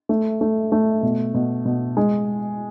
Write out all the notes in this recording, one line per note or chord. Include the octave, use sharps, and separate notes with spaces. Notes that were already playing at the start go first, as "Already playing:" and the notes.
A3
A3
A3
B2
B2
B2
G#3